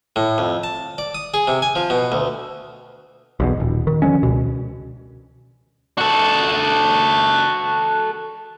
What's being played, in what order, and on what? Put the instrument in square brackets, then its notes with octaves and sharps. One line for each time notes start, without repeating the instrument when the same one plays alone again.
[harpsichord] A2
F2
A5
D5
D#6
G#4
C3
G#5
F3
B2
D2
[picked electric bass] B1 E2 B2
D#1
D#3
D3 F3 G#3 C#4
C#2 B2
[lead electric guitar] F#4 A4